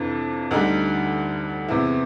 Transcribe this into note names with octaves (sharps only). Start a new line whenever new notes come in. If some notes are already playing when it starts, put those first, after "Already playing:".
Already playing: F2 C3 E3 D4
D2 D3 G3 D#4
E2 C3 E3 E4